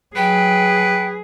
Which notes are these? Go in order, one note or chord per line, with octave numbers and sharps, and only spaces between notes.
F#3 G#4 B4 G5